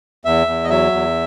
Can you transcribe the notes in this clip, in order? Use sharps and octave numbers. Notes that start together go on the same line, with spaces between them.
E2 E5
E2
D#5
F#3 E5
E2